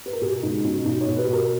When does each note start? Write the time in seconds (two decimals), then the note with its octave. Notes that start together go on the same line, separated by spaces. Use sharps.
0.06 B4
0.13 A#4
0.21 B2 G#4
0.43 C#2 D#4
0.64 B2 C#4
0.86 B2 D#4
1.01 C#5
1.07 B2
1.17 B4
1.28 B2
1.33 A#4